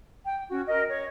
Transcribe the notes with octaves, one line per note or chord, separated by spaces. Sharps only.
G5
C#4 F#4
A#4 D#5
C#5